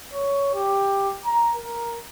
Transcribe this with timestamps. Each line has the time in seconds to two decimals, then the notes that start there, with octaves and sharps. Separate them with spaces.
0.13 C#5
0.55 G4
1.26 A#5
1.55 A#4